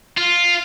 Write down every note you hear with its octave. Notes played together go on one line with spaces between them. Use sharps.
F4